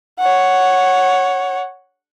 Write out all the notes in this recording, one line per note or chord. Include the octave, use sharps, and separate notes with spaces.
C#5 F#5